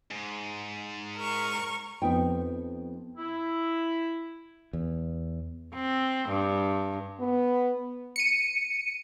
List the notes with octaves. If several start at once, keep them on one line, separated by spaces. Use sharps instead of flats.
G#2
A#4 C#6
F2 B3 D#4 G5
E4
E2
C4
G2
B3
C#7 D#7